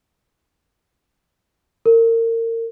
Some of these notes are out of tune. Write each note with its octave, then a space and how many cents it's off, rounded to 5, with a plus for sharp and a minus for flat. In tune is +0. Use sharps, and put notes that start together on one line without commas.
A#4 -35